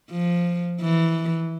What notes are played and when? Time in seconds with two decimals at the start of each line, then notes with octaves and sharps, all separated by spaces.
0.11 F3
0.82 E3